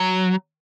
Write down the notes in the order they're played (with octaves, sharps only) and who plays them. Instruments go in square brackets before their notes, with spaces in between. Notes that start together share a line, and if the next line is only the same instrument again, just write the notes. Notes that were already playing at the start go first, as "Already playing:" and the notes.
Already playing: [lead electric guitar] F#3